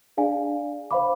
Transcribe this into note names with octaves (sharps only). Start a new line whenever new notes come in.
D4 G#4 D5 F5 G#5
C5 F5 B5 D6